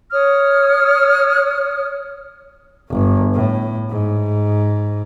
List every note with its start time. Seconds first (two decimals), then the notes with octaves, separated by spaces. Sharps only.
0.11 C#5 D#6 F6
2.90 G1
3.34 A2
3.89 G#2